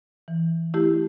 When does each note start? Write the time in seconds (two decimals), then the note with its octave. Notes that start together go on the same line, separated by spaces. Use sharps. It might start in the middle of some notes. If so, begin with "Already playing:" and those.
0.28 E3
0.74 A3 E4 G4